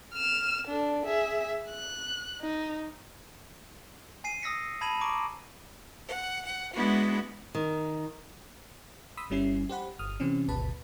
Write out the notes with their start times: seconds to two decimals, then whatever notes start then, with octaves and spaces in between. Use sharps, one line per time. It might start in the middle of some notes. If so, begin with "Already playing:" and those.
0.14 F6 E7
0.67 D4 A4
1.04 G#4 E5
1.69 F#6
2.41 D#4
4.24 G#5 C7 D#7
4.42 D#6 E6 A#6 B6 C#7
4.81 A5 B5 G#6 D#7 E7 F#7
5.01 A#5 C#6 D6 D7
6.08 F#5
6.45 F#5
6.74 G#3 B3 D4 E4 F#4
7.55 D#3
9.17 B5 C6 D#6 E6 B6
9.30 G1 G3 C#4 E4 G#5 C7
9.69 G4 C5 F#5 B5
9.99 G1 D#6 F6
10.20 C3 E3 C4 C#4
10.48 G#1 D2 B2 B4 A5 B5